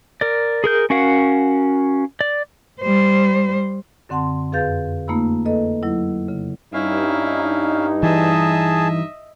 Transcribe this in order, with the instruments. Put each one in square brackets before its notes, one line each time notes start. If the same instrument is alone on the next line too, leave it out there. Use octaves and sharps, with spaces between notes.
[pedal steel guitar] A#4 D5
G#4 A#4 G6
C#4 F#4 A#4 F5 F#5
D5
[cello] G3 C5
[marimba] F#2 D3 C4 F#5 A5 C6
F2 G#4 B4 F5 G6 A6
A3 A#3 D#4 F4 B5 E6
A#3 A4 B4 D#5
F#3 E4
C#3
[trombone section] G2 D#4 [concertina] C#4 F5 [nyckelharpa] E4
[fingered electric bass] E3 [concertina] G#4 A5 [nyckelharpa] D#5 E5